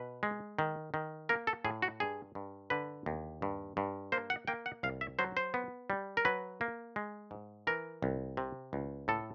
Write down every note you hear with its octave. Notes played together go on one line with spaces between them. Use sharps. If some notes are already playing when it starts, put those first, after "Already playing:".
Already playing: B2 B4
G#3
D#3
D#3
A#3 A#4
A4
A2 G#4
F#4
G2 G#4
G2
D3 B4
D#2
G2
G2
A#3 C5
F#5
A#3 G5
F#5
C2 F5
E5
F#3 C5
C5
B3
G3
A#4
F#3 B4
A#3
G#3
G#2
E3 A#4
C2
C3
C#2
A2 A4